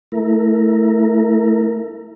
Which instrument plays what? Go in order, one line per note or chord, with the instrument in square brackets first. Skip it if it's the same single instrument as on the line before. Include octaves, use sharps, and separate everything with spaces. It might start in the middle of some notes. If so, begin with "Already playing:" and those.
[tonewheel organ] A3 E4 A#4